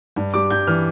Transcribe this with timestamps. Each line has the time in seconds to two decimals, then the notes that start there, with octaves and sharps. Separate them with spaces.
0.16 G2
0.34 G3 D6
0.50 G2 G6
0.67 E3 F6